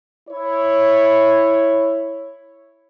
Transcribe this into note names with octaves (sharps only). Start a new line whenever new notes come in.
E4 C#5